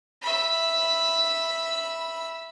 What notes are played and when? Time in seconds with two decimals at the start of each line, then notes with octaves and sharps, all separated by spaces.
0.22 E5 B5